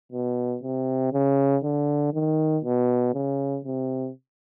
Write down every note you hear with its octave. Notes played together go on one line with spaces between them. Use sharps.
B2
C3
C#3
D3
D#3
B2
C#3
C3